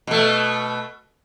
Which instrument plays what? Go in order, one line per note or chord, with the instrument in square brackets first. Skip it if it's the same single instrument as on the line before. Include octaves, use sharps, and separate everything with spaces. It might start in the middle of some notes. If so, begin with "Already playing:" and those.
[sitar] B2 A3